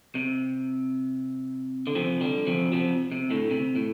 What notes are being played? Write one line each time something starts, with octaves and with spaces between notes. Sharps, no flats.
C3
D3
C3 F3
D3 G3
C3 F3
C3 F3
C3
A2 D3
C3
A2